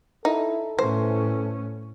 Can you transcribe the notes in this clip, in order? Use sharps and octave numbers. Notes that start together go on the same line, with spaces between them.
D#4 E4 A4
A2 E3 C#4 C5